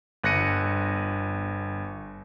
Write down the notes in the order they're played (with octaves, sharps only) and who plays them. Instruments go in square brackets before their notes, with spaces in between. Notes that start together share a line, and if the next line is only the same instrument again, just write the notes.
[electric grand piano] G1 F#6 A#6 C#7 D#7